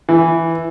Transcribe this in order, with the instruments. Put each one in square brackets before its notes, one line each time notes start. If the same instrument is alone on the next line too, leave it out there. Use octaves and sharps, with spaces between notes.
[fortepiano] E3